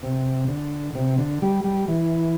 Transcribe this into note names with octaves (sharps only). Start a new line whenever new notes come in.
C3
D3
C3
D3
G3
G3
E3